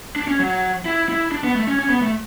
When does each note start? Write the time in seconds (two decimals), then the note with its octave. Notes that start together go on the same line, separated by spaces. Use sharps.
0.16 D4
0.28 C#4
0.39 F#3
0.85 E4
1.09 E4
1.32 D4
1.44 B3
1.55 A3
1.67 C#4
1.79 C#4
1.90 B3
2.02 A3